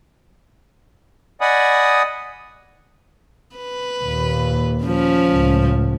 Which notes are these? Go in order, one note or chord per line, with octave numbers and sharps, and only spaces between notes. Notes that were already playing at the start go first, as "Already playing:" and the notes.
D5 D#5 F#5 G#5 B5 D#6
B4
D#2 A#2
F3 C#4
C#2 A2